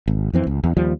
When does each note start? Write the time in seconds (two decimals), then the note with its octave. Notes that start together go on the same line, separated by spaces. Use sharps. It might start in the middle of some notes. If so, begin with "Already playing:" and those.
0.08 G#1
0.33 F2 E3 C4
0.47 C#2
0.64 E2
0.77 D#2 F3 G3